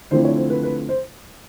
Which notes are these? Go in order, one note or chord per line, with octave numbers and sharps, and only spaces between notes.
D3 F3 A3 C4 E4 C5
C#5
C5
B4
B4
C5